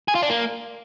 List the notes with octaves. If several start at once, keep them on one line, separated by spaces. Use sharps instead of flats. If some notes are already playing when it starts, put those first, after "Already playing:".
G#4
F4
D4
A#3